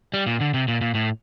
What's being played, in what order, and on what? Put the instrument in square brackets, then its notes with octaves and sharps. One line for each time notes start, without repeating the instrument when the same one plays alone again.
[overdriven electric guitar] G3
A#2
D3
C3
A#2
A#2
A2